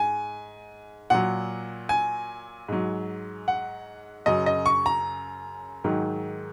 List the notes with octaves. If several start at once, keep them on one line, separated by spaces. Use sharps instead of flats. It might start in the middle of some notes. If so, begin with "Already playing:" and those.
Already playing: G#2 G#5
A#2 F#3 F#5
G#5
G#2 F#3
F#5
F#2 C#3 F#3 D#5
D#5
C#6
A#5
G#2 D#3 F#3